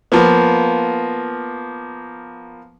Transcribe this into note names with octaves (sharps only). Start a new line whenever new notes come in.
F3 A#3 B3